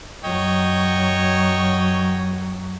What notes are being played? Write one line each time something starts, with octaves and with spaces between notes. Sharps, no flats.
F#2 F#3 C#5 D#5 G5